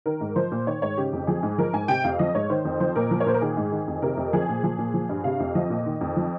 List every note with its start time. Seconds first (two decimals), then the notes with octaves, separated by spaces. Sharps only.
0.06 D#3 A#4
0.21 G#2
0.36 F3 C5
0.52 A#2
0.67 D#3 C#5
0.82 G#2 C#5
0.97 C#3 G4
1.13 F2
1.27 F3 G#4
1.43 G#2
1.58 F3 A#4
1.73 G#2 G#5
1.88 C3 G5
2.04 F2 F5
2.19 F3 D#5
2.35 G#2 C#5
2.50 D#3 C5
2.65 F2
2.80 F3 C5
2.96 A#2 A#4
3.11 F3
3.20 C#5
3.26 A#2 C5
3.34 A#4
3.41 D#3 G#4
3.57 G#2
3.72 D#3
3.88 F2
4.02 C3 A#4
4.17 F2
4.33 F3 G#4
4.49 A#2
4.64 F3 G#4
4.79 A#2
4.94 F3
5.09 G2
5.24 C3 F5
5.40 F2
5.55 F3 D#5
5.70 A#2
5.86 D#3
6.01 F2
6.17 F3